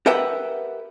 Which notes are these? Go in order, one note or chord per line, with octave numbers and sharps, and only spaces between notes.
G4 A#4 B4 E5 F#5 G5